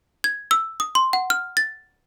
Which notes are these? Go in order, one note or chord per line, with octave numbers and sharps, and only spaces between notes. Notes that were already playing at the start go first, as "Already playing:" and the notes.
G#6
E6
D#6
C6
F#5
F6
A6